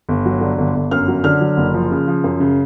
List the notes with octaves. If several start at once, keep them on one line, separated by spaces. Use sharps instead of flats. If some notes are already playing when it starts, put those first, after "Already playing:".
G1
F#3
D3
G1
G1
F#2 F6
F#3
D3 F6
F#3
F#1
F3
C#3
F3
F#2
C#3